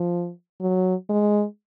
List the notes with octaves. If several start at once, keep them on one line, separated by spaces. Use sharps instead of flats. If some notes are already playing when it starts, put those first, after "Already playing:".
Already playing: F3
F#3
G#3